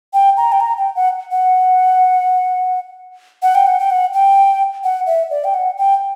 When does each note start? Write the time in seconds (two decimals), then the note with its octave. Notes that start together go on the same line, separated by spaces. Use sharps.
0.13 G5
0.37 A#5
0.52 G5
0.60 A#5
0.78 G5
0.96 F#5
1.31 F#5
3.42 F#5
3.55 G5
3.67 F#5
3.79 G5
3.90 F#5
4.13 G5
4.84 F#5
5.07 E5
5.31 D5
5.44 G5
5.54 F#5
5.77 G5